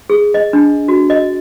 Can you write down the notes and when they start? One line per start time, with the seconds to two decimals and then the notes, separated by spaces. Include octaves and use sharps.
0.10 G#4
0.34 D#5
0.53 D4
0.88 F#4
1.10 D#5